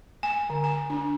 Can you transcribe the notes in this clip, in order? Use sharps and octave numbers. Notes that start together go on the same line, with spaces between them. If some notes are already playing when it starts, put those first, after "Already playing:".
G#5
D3
G#5
D4